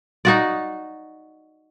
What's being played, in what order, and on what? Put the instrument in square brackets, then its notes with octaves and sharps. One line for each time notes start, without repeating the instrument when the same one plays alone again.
[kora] D#4 F#4 D5